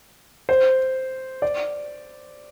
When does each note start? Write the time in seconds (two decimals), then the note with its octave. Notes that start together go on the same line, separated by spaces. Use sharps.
0.49 C5
1.42 D5